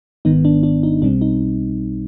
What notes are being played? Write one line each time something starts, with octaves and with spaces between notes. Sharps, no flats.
G#1 G#2 D#3 B3 D#4
D4
D4
D#4
B1 B2 G3 C4 D4
D#4